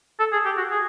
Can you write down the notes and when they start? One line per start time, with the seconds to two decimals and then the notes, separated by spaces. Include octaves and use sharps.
0.19 A4
0.32 G#4
0.45 G4
0.57 F#4
0.71 G#4